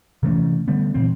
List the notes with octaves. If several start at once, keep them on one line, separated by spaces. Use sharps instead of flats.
C3 E3 A3 C#4
D3 G3 A3 B3
A#2 E3 C4